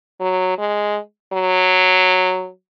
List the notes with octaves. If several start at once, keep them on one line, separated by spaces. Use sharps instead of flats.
F#3
G#3
F#3